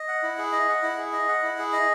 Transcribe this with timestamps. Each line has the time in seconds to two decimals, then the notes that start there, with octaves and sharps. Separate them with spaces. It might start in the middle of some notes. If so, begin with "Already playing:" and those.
Already playing: D#5
0.08 F#5
0.23 E4
0.38 G#4
0.52 D#5
0.68 F#5
0.83 E4
0.98 G#4
1.13 D#5
1.28 F#5
1.43 E4
1.58 G#4
1.73 D#5